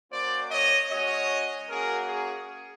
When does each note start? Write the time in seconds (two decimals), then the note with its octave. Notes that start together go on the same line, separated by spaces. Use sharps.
0.11 A#3 C#4 F#4 C5 D5
0.50 C#5 D#5
0.90 G#3 C#4 F#4 C#5 D#5
1.69 A#3 C#4 F#4 G#4 A#4
2.08 G#4